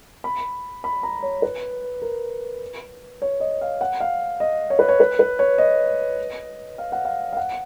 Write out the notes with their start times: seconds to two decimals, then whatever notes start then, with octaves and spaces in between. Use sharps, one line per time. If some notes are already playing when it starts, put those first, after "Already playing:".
0.24 B5
0.84 B5
1.03 A#5
1.23 C#5
1.42 B4
2.02 A#4
3.22 C#5
3.40 D#5
3.61 F5
3.81 F#5
4.00 F5
4.40 D#5
4.70 C#5
4.79 B4
4.89 C#5
5.00 B4
5.19 B4
5.39 C#5
5.58 D#5
6.78 F5
6.92 F#5
7.05 F5
7.33 F5
7.37 F#5